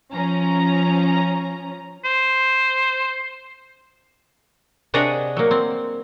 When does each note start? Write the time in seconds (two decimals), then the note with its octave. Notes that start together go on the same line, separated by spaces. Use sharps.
0.13 F3 C#4 A#5
2.05 C5
4.94 C3 D4 G#4 C#5 D#5 F#5
5.37 F#3 A#3
5.51 C4